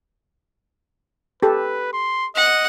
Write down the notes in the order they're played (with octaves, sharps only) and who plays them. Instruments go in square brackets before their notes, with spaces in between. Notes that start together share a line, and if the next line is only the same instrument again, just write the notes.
[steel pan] G4 A4 [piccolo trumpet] B4
[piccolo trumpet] C6
[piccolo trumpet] D#5 [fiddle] F#5